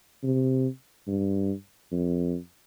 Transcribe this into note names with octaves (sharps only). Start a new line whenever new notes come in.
C3
G2
F2